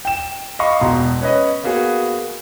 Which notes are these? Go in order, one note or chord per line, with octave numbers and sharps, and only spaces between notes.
G5 E7
D#5 F5 B5 C#6
E1 B2 A#5 C6
C#4 B4 D#5
A#3 B3 F#4 G#4